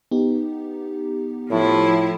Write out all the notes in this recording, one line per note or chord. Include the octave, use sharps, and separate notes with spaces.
B3 D#4 G4
A2 F3 E4